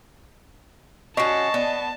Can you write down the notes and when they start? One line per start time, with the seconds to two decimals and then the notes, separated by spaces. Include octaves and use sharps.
1.17 C#4 F#4 D#5 A5 C#6 C7 D7
1.54 B3 D5